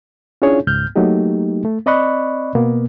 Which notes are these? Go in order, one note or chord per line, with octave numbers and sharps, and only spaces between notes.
C#4 D4 E4 F4 G#4 C#5
C#2 G#2 F6 G6
F#3 A3 A#3 D#4 G4
A3
C4 D5 D#5 B5 C#6 F#6
B2 A#3 B3